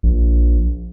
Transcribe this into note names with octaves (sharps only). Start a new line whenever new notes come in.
A#1